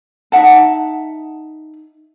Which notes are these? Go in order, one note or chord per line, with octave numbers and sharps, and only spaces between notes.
D#4 E5 F#5 A5